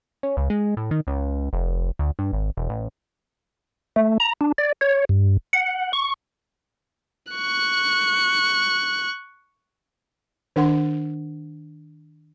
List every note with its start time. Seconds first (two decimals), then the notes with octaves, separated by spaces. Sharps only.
0.23 C#4
0.37 C#2
0.50 G#3
0.77 A2
0.91 D#3
1.07 C#2
1.53 F1
1.99 D2
2.19 G2
2.33 G#1
2.57 E1
2.69 A1
3.96 A3
4.20 A#5
4.41 D4
4.58 D5
4.81 C#5
5.09 G2
5.53 F#5
5.93 C#6
7.33 C#6 F#6
10.56 D#3 D4 A#4 F#5 C6